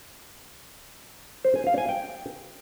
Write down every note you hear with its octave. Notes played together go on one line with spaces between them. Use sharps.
C5
G#5
F5
G#5
G5